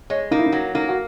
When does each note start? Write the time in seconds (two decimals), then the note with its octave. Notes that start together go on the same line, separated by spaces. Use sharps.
0.10 G#3 C#5
0.31 A#3 D#4
0.39 E4
0.46 D#4
0.52 F#3
0.75 A#3 D#4
0.89 F#4